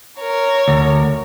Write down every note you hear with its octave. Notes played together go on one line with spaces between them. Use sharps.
A#4 C#5
D2